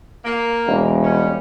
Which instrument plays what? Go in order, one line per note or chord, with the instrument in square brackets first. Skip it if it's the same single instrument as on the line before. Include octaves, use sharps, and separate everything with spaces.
[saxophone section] A#3
[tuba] E1
[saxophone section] G3 C#4